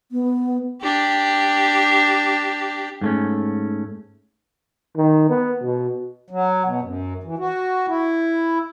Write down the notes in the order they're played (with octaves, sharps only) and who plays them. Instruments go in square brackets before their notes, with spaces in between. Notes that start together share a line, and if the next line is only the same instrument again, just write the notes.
[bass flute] B3
[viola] D4 G4
[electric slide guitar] G#2 A3 C#4
[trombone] D#3
B3
B2
[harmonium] F#3
B2
F#2
E3
F#4
E4